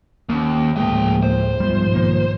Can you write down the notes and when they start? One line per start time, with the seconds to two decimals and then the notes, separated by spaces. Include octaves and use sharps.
0.29 D#2 A#3 C#4
0.76 D2 A2 F3 G#3 A#3 G#4 G5
1.23 C5
1.60 B1 G#2 F3 G3 B3
1.95 D#3 A#3